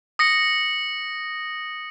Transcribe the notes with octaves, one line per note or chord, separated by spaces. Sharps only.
D#6 A#6 C#7